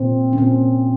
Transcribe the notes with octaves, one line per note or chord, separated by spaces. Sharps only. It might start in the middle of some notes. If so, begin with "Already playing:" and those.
Already playing: A#2 C4
C#4
A#2 C4